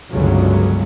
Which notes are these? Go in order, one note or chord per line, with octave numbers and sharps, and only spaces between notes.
G1 C#2 G2 C#3 F#3 G#3